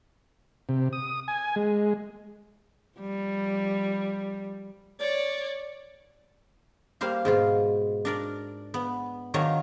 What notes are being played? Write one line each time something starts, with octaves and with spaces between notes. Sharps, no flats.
C3
D#6
G#5
G#3
F3 G3
C#5 D5
G3 A#3 C5 F5
G#2 B2 F4
D4 A#4 D5
B3
D#3 F#3 D4 F4 C#5 A#5